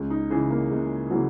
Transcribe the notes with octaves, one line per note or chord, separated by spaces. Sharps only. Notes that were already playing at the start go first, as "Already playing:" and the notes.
Already playing: C#2
D#4
C#3 E3 G#4
A#3
C#2 G#3
C#3 E3 F#3